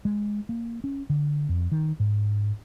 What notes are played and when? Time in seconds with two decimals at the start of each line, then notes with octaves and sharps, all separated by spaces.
0.05 G#3
0.49 A#3
0.84 C#4
1.10 D3
1.49 F2
1.72 D#3
2.00 G#2